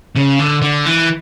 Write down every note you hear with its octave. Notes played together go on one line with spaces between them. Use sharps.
C#3
D3
D3
E3